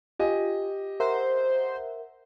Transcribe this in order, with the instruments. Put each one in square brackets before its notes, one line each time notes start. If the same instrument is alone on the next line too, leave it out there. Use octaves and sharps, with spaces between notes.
[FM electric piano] F4 [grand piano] G4 D#5 G#5
[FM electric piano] A#4 E5 F#5 [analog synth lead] C5